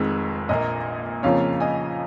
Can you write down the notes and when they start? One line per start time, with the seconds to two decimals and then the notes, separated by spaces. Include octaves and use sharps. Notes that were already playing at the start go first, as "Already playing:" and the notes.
Already playing: F1 F2 D#3 G#3
0.49 A#1 A#2 A#3 D#5
1.23 F2 C#3 F3 A#3 C#5 F5
1.60 D#5 G#5